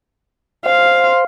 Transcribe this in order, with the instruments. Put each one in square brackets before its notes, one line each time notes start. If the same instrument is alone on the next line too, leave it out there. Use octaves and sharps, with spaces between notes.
[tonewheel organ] C5 [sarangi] F5